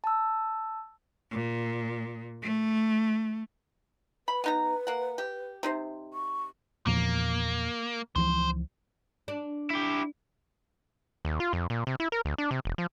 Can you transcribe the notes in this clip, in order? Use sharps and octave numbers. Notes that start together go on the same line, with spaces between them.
A5 E6
A#2
A3
B4 B5
B3 D#4 A#5
A#3 F#5
G4
C3 D#4 C5
C#6
E2 A#2 F3 A#3
C#2 E3 F3 C5
D4
E4 G4
D#2
F4
F2
A#2
C3
E4
A#4
D2
D4
C3
E1
F3